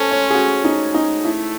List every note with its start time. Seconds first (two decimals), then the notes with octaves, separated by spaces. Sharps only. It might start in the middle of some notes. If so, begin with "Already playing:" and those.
Already playing: C#4 A4 C5
0.11 C#5
0.30 G#4
0.34 F#4
0.64 D#4
0.94 D#4
1.25 A3 E4